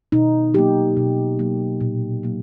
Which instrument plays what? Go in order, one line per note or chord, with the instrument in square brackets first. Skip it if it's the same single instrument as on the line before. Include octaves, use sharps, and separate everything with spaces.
[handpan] B2 D#4
F#3 A#3 G4
B2
F#3 A#3
A#2
F#3 A#3